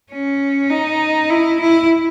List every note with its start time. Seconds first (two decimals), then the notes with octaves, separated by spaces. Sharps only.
0.11 C#4
0.70 D#4
1.30 E4
1.60 E4